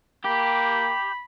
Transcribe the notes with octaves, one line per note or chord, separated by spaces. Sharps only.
A#3 G4 B5